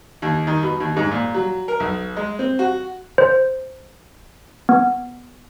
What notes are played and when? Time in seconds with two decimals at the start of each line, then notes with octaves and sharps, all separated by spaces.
0.22 D#2
0.47 D#3
0.63 B2
0.80 D#2
0.96 G#2
1.11 A#2
1.34 F#3
1.68 A#4
1.80 B1
2.16 G#3
2.39 C4
2.59 F#4
3.18 C5
4.69 B3